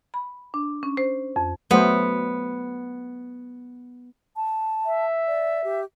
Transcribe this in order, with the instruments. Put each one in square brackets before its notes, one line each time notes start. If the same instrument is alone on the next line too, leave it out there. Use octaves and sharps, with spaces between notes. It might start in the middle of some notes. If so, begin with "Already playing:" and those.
[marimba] B5
D4
C#4
C5
F2
[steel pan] F#3 A3 C5 [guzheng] B3
[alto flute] A5
[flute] E5
[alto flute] D5
G4